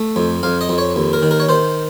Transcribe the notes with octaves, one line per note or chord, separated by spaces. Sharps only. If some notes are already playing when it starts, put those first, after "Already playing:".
Already playing: A3
F2
F2 F5
D#5
F2
C#5
D#2
A#4
D#3
A#4
C#5
D#3 C5